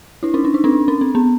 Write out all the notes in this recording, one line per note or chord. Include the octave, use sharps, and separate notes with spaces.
D4 E4
C#4 D#4
D4
D#4
C4 D4
C#4
C4
B3